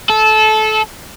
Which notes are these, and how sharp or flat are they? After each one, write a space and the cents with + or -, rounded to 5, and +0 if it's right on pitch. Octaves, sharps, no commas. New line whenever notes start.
A4 -20